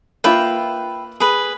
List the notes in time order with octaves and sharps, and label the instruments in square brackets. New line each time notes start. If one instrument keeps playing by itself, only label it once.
[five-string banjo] A#3 F4 [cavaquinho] B4 E5 G5
[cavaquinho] G#4 B4